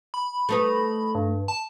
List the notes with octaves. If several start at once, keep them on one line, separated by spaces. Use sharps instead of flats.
B5
A3 D#4 B4
G2
A5